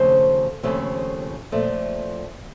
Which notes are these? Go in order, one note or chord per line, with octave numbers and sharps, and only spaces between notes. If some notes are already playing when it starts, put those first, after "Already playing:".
Already playing: D#2 C#3 F3 A3 C4 C5
D#2 C#3 F3 A3 C4
A#2 F3 A3 C4